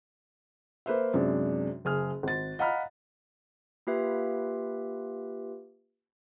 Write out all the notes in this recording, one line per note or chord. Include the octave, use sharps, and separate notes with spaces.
A#3 B4 C5 E5
F#2 C3 G#3 D4
F#1 G#4 F6
G#1 A6
D#5 F5 F#5 A#5 B5 F6
A#3 F4 G4 B4 E5